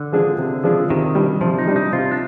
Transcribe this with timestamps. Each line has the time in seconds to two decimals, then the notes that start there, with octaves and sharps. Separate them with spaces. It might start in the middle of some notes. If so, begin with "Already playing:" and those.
Already playing: D3
0.12 F3 G#3 D4 G#4
0.38 C3
0.64 F3 G#3 D4 G#4
0.90 C3 D#3
1.15 G3 D4
1.41 C3 F3
1.58 D#4
1.67 G3 D4
1.76 D#4
1.93 C3 F4
2.11 D4